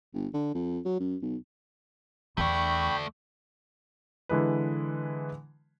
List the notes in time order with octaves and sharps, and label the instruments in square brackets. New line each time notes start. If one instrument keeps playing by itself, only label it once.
[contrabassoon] G1
D3
F2
F#3
F#2
B1
[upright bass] E2 [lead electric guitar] A3 D5 [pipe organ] G5 B5 [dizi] C#6
[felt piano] D3 E3 G#3 B4